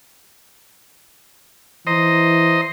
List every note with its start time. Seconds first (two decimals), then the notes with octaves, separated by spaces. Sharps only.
1.87 E3 C5 D#5 A#5